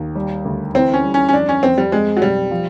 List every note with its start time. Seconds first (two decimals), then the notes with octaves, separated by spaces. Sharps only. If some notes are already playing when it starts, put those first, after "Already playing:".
Already playing: D#2
0.15 G3
0.45 D2
0.75 E3 C4
0.94 C#4
1.04 G3
1.14 C#4
1.29 C#4
1.33 F2 D4
1.49 C#4
1.63 F2 C4
1.78 G3
1.92 G#3 C4
2.17 F#3
2.21 B1 G3
2.51 F3